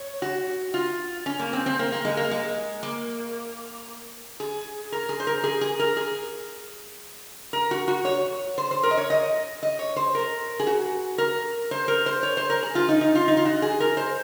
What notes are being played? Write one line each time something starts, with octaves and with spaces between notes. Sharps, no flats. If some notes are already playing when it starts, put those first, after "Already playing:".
Already playing: C#5
F#4
F4
C#4
A#3
C4
C4
A#3
A#3
G#3
A#3
G#3
A#3
G#4
A#4
G#4
C5
A#4
G#4
G#4
A#4
G#4
A#4
F#4
F#4
C#5
C5
C5
A#4
D#5
C#5
D#5
D#5
C#5
C5
A#4
G#4
F#4
A#4
C5
A#4
C5
C#5
C5
A#4
G#4
F4
D#4
D#4
F4
D#4
F4
F#4
G#4
A#4
C5